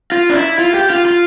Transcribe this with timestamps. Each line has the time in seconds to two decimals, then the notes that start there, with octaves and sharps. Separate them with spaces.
0.12 F4
0.30 D4
0.35 E4
0.59 F4
0.74 G4
0.90 F4
1.05 F4